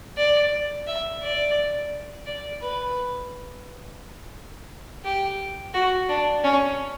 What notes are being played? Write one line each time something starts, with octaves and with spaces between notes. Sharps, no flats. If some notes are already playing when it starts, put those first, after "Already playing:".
D5
E5
D5
D5
B4
G4
F#4
D4
C#4